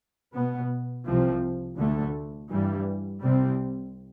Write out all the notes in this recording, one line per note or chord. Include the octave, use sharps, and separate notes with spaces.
B2 B3
C2 C3 F3 C4
D2 D3 A3
G2 E3 G3
C2 C3 G3 C4